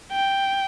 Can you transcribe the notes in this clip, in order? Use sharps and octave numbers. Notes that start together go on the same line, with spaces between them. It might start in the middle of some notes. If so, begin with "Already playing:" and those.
G5